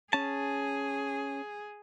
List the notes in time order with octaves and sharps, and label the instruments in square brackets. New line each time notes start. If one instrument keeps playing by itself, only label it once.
[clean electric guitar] C#4 A5 [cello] G#4